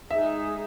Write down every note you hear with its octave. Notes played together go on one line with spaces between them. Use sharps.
G#3 D#4 G#4 E5